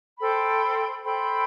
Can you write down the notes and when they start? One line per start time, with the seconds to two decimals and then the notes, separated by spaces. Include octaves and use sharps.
0.19 A4 C5 G5 B5
1.03 A4 C5 G5 B5